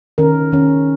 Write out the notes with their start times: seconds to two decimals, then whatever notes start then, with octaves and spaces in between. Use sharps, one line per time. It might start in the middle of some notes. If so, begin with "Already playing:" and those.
0.18 D#3 C#4 A#4
0.52 D#3 C#4